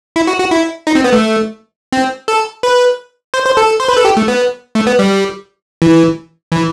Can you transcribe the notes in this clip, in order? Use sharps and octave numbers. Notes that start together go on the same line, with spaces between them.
E4
F#4
F#4
E4
D#4
C4
B3
A3
C4
A4
B4
C5
C5
A4
C5
B4
A4
G4
A3
B3
A3
B3
G3
E3
E3